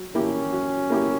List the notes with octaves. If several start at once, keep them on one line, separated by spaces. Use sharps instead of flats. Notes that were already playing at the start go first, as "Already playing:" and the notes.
Already playing: F#3
A#3 C#4 E4 G4
F#3
A#3 E4 G4